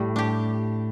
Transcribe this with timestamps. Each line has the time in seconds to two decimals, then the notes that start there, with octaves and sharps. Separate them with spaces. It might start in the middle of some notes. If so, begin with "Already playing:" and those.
Already playing: A2 G3
0.16 D4 G4